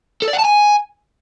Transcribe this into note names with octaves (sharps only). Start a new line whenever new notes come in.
A4
D5
F#5
A5
G#5